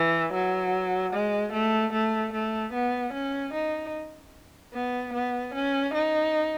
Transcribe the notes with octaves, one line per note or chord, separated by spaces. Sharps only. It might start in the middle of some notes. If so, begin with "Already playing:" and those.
Already playing: E3
F#3
G#3
A3
A3
A3
B3
C#4
D#4
B3
B3
C#4
D#4